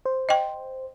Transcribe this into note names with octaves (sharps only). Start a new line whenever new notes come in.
C5
D#5 G5